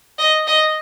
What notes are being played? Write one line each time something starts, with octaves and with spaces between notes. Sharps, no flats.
D#5
D#5